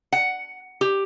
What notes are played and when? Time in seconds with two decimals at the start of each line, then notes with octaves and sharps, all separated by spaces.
0.13 F#5
0.81 G4